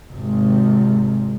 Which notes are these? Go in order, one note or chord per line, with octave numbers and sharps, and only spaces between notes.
G#1 C3